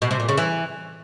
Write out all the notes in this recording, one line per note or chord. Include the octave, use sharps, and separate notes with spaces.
B2
C3
A#2
C#3
E3